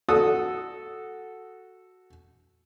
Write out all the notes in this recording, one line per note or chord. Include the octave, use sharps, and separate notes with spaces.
F#4 A4 D#6